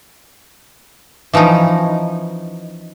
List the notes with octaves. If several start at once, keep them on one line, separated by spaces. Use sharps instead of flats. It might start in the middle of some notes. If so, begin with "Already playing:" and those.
E3 F3 C#4 D#4